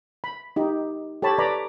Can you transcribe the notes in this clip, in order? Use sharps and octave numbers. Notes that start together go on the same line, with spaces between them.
B5
D#4 G4
G4 A4 C#5 A5 B5
B4 D5 A#5 B5